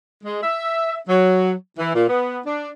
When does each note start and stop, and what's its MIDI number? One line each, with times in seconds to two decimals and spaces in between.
0.24 0.40 56
0.43 0.97 76
1.09 1.52 54
1.79 1.94 52
1.95 2.05 46
2.09 2.39 59
2.46 2.70 62